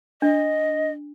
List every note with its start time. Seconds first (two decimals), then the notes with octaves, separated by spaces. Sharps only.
0.22 D4 D#5